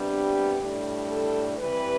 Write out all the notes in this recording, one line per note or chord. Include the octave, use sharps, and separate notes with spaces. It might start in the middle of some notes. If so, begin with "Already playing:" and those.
Already playing: C3 G3 B3 D4
G4
A2 G3 D4
A4
C3 E3 G3 B4